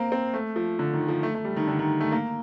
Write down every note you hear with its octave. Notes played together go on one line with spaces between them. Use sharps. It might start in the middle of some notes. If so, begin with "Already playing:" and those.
Already playing: A#3 C4
C4
A3
F3
D3
D#3
F3
A3
A3
G3
D#3
D3
D#3
A3
A#3